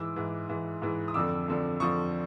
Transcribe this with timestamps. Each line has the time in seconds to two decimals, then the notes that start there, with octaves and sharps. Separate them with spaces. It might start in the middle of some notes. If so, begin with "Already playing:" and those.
Already playing: G#2 E3 D6 E6
0.16 G#2 E3
0.49 G#2 E3
0.82 G#2 E3
1.08 D#6
1.14 F2 D3 F3 D6 E6
1.48 F2 D3 F3
1.80 F2 D3 F3 C#6 D#6